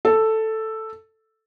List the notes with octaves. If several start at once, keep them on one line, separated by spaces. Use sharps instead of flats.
A4